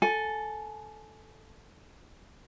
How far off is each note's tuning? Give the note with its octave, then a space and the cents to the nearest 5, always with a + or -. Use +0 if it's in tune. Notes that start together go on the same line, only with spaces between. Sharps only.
A4 +0 G#5 +15